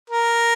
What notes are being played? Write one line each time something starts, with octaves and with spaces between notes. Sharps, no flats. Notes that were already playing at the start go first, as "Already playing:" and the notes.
A#4